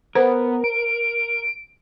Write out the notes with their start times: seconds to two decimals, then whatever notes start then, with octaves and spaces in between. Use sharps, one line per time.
0.15 B3 A#4 C5
0.64 D7